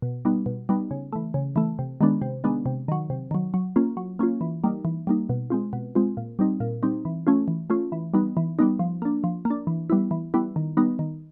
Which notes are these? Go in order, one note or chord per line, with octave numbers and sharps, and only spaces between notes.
B2
G3 B3 D#4
B2
G3 B3 D#4
C#3
E3 A3
C#3
E3 A3
C3
D#3 G#3 B3 D4
C3
D#3 G#3 B3 D4
C3
D#3 F#3
C3
D#3 F#3
F#3
A#3 C#4 F4
F#3
A#3 C#4 F4
E3
G3 A#3 D#4
E3
G3 A#3 D#4
B2
G#3 C4 F4
B2
G#3 C4 F4
A#2
G3 C4 D#4
A#2
G3 C4 D#4
E3
A3 C#4 F4
E3
A3 C#4 F4
E3
G3 B3 D#4
E3
G3 B3 D#4
F3
A#3 D4
F3
A#3
D4
E3
G3 B3 E4
E3
G3 B3 E4
D#3
G3 B3 D#4
D#3